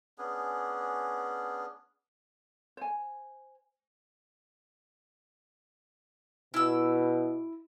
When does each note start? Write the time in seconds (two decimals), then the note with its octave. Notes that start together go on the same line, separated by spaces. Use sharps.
0.18 B3 C#4 D4 G#4
2.77 C5 G#5
6.54 B2 E4 E6